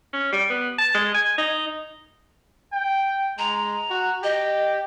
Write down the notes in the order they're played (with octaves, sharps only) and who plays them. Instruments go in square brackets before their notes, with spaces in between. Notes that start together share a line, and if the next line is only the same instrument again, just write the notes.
[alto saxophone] C#4
G3
B3
A5
G#3
G#5
D#4
[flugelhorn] G5
[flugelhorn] G#3 [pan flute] A#5
[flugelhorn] F#4
[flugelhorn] G4 [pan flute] D#5